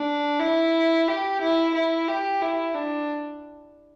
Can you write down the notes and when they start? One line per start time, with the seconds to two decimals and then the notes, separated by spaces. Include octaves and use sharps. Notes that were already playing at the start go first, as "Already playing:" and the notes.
Already playing: D4
0.40 E4
1.07 G4
1.41 E4
1.74 E4
2.08 G4
2.42 E4
2.74 D4